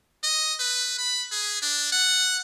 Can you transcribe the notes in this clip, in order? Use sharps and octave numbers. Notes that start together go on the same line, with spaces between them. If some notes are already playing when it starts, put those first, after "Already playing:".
D#5
B4
B5
G#4
D4
F#5